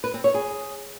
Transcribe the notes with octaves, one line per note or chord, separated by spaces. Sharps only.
B4
C4
C#5
G#4